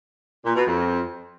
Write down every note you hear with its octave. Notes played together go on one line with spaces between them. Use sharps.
A#2
B2
F2